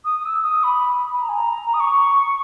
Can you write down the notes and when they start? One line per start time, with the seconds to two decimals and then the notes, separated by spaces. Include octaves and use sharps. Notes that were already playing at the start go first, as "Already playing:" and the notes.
0.05 D#6
0.25 E6
0.44 D#6
0.63 B5
1.21 A#5
1.29 G#5
1.36 A#5
1.73 D#6
1.80 C#6